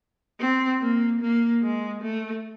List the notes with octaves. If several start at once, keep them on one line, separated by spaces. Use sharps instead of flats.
C4
A#3
A#3
G#3
A3